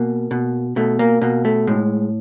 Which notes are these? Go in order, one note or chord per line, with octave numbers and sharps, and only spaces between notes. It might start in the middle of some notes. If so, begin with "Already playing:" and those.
Already playing: B2 A#3
B2
B2 A3
A#3
B2 A#3
A3
A2 G#3